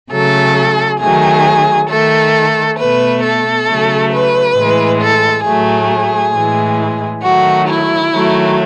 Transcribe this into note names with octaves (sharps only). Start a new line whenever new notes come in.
C#3 F#3 A3 A4
D#3 F#3 A3 G#4
D#3 A3 A4
B2 A3 B4
A4
C#3 F#3 A3
B4
A2 E3 G#3
A4
A2 F#3 A3 G#4
A2 E3 G#3
D#3 F#3 A3 F#4
E4
D#3 F#3 A3